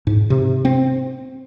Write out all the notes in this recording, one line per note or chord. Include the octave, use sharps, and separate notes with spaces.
G#2
C3
C4